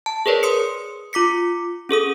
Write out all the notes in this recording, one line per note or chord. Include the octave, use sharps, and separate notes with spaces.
A5
G#4 A#4 B4 C#5 D5
C6 D#6 C#7
F4 D6 B6 C#7
C#4 G#4 A4 D#6